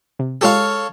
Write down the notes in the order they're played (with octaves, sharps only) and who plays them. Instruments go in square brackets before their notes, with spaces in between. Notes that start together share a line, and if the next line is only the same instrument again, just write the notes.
[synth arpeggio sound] C3
[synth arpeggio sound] G#3 F4 G4 [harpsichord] A4 C#5 F5